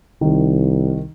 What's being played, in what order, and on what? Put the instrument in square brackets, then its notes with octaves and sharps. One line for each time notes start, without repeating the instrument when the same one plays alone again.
[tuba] C2 [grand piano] D#3